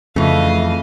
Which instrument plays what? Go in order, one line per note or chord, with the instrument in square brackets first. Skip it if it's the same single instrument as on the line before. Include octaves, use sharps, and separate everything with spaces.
[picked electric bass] F2 [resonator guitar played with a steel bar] C#3 E3 [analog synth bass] A3 [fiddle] D#5 F5